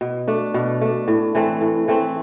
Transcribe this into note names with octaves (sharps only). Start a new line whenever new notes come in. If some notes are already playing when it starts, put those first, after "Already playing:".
B2
A3 D4
B2
A3 D4
A2
E3 A3 C4
A2
E3 A3 C4